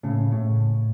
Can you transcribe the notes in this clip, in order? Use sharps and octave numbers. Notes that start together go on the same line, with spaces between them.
A2 C#3
A2